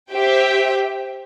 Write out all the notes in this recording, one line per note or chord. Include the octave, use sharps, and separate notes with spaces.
G4 C5 E5 G5